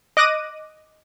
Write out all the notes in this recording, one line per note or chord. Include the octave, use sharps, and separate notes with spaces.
D#5 D6 F#6 A#6 D#7